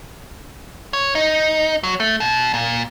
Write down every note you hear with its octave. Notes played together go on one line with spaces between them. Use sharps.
C#5
D#4
F#3
A3
B2
A#2